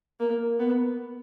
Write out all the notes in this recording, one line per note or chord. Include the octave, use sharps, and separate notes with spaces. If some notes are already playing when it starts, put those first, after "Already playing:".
A#3
B3